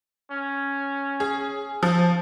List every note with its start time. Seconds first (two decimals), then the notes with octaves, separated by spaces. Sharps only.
0.32 C#4
1.20 G#4
1.83 F3